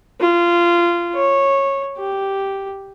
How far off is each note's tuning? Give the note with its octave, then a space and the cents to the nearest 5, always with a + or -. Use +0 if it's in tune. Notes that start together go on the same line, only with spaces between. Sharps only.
F4 -20
C#5 -15
G4 -5